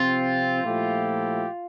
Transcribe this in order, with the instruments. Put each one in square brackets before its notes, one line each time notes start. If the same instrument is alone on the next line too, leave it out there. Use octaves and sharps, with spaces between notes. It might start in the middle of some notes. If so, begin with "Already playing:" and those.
Already playing: [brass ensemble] C3 F3 C4 [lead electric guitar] F4
[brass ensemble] A#2 F3 A3 E4 G4